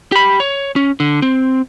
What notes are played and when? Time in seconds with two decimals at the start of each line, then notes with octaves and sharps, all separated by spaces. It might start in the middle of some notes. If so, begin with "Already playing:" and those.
0.12 G4 B5
0.40 C#5
0.76 C#4
1.00 D3
1.22 C4